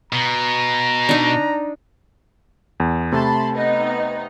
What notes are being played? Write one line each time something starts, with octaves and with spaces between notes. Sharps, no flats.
B2 A#5
D4 D#4
E2
C3 A3 A5 B5 C6
B3 D#4 D#5